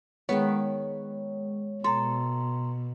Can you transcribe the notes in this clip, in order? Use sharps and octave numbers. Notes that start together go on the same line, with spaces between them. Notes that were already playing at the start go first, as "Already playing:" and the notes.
D#3 G#3 B3 C#5
B2 A4 A#5 C6